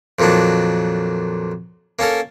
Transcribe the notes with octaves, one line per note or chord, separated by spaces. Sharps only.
F2 A#2 D#3 F#3 D4
A#3 C#4 A4 A#4